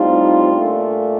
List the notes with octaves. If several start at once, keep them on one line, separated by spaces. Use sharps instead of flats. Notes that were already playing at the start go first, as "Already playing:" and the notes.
Already playing: A2 G3 C4 D#4 F4
A#2 A3 D4